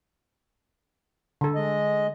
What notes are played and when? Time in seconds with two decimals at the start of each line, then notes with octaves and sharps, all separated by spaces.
1.41 D3 A4
1.55 G#3 D#5